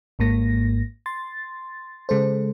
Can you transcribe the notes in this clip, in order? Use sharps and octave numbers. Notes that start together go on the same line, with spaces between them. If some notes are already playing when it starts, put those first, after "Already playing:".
G#1 G#2 A#3 A#6
C6 A6
C#3 G#3 A4 C5